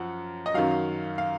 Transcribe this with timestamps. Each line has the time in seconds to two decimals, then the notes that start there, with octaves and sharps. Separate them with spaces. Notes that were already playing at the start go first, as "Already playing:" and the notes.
Already playing: F#2 F3 F#5
0.46 D#5
0.54 F#2 D#3 F#3 F5
1.18 F5